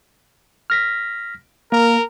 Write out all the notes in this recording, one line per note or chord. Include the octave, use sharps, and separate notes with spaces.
F6 A#6 B6
A#3 A#4